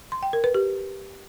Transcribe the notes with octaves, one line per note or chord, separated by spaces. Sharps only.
C6
G5
A#4
B4
G4